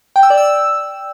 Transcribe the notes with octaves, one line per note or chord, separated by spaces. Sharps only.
G5
E6
D5
E6